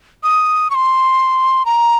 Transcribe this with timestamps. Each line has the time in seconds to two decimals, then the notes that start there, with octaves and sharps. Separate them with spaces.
0.23 D#6
0.70 C#6
0.75 C6
1.66 A#5